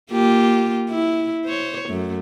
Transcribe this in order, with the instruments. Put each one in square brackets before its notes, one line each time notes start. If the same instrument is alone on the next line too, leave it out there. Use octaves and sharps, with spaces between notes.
[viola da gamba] A#3 F4 G4
E4
C5 C#5
F#2 A3